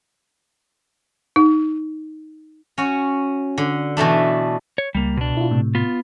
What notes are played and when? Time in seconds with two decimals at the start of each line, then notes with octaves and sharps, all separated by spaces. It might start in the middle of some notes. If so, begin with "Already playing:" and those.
1.36 D#4
2.78 C#4 F#4
3.58 D3
3.97 B2 E3 A3 D4
4.78 C#5
4.95 C#2 G3 A#3
5.17 B2 D4
5.37 E4 F4
5.51 A2 C3
5.75 B3 F4